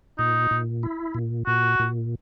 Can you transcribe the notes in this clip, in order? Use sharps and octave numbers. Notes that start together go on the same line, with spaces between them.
A#2 D#4
A#2
E4
A#2
A#2 F#4
A#2